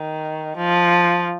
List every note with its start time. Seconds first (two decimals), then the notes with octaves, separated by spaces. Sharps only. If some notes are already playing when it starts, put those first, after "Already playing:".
Already playing: D#3
0.57 F3